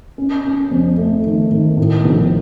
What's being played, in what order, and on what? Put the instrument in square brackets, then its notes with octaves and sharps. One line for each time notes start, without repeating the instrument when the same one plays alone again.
[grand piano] C#4
C#4
F2
A3
D#3
D#3
A2
A#1